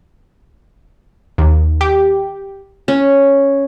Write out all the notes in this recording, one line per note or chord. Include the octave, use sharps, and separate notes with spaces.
D#2
G4
C#4